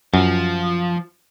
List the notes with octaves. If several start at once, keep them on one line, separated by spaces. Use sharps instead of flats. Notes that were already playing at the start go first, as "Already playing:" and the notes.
F#2 F3